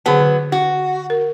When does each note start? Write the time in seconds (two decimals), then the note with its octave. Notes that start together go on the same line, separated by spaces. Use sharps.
0.06 D3 F#3 B3 G#4 A5
0.20 D3
0.52 F#4
1.10 A#4